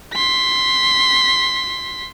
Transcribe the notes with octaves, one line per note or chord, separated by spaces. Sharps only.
C6 B6